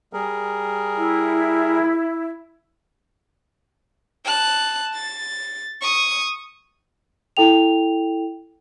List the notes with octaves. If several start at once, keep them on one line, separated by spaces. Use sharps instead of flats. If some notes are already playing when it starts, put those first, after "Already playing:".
G3 G#4 A#4
E4
A5 F#6
A6
C#6 D#6
E4 A4 G5 F7